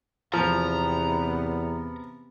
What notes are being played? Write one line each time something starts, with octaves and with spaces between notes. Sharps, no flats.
E2 C3 F3 B3 A#5